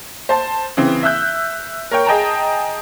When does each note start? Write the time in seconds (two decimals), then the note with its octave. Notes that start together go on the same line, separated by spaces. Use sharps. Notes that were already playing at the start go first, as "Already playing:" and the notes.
0.29 C5 A5
0.77 C#3 E3 C4
1.03 E5 E6 F#6 G6
1.91 A#4 C#5 G5
2.06 G#4 D#5 G5 A5 A#5